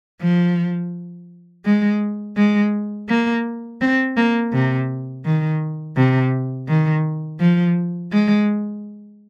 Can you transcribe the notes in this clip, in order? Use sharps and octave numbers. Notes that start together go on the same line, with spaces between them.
F3
G#3
G#3
A#3
C4
A#3
C3
D#3
C3
D#3
F3
G#3